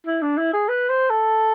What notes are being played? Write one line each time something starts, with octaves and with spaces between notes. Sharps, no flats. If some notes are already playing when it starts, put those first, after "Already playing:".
E4
D4
E4
G#4
B4
C5
A4